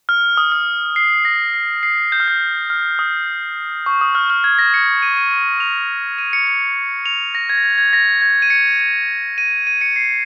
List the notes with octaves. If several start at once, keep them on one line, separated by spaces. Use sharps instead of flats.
F6
D#6
F6
C7
A#6
C7
C7
G6
F6
G6
F6
D#6
C#6
D#6
F6
F6
G#6
A#6
C#7
D#7
D#7
D#7
F7
D#7
C#7
C#7
F7
A#6
G#6
A#6
G#6
G#6
A#6
G#6
D#7
C#7
D#7
D#7
D#7
C#7
C7